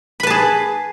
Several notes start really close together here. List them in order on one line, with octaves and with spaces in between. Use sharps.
B5 B4 A5 G#4